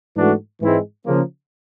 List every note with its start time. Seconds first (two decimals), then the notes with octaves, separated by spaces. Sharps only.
0.16 G#2 E3 A3 D4 F#4
0.61 G#2 E3 G#3 C4 E4
1.06 C#3 F3 A#3